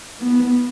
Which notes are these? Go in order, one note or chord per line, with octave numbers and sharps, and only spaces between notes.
B3